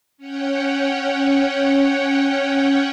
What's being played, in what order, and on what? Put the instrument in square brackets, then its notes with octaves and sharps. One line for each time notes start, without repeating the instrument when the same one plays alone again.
[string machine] C#4 C#5 F#5 G5